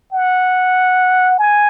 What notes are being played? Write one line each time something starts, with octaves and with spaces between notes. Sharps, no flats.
F#5
G#5